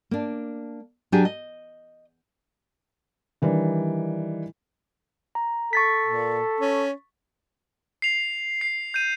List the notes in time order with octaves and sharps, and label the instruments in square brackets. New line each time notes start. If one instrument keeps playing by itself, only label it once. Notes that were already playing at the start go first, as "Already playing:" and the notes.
[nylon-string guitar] A#3 D4
F#3 D4 G4 G#4 G#5
D#5
[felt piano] D#3 E3 G3 D4
[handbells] A#5
[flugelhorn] A4 [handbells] C#6 A6 B6
[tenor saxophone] A#2
C#4
[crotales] C7 F7
C7
G6 D#7